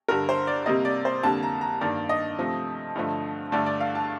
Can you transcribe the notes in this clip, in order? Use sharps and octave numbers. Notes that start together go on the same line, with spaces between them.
G2 D3 G3 A#4
C5
D5
C3 G3 A#3 D#5
D5
C5
F2 D3 G3 A#3 A5
A#5
A#5
G2 D#3 A#3 D5
D#5
C3 F3 A3
G2 D3 F3 A3
G2 D3 A3 D5
D5
F5
A5